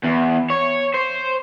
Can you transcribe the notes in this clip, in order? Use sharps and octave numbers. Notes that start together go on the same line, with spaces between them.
E2
C#5
C5